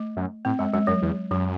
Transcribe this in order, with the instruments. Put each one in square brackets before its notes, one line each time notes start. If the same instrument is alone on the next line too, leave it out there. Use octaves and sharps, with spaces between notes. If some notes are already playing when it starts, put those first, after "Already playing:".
Already playing: [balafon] A3
[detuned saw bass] F#2
[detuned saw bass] A2 [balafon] C4
[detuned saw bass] F#2 [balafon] G#3
[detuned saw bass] F#2 [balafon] G#3
[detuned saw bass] F#2 [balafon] F#3
[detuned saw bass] E2
[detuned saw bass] F#2 [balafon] F#3